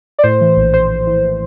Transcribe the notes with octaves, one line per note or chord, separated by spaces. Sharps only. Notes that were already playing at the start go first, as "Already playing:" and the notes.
D5
A2 C5
E3
A#1
A#1 C5
A#1
E3